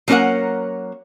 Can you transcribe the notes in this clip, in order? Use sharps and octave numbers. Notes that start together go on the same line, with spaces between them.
F#3 A#3 C#4 G4 A#4 F#5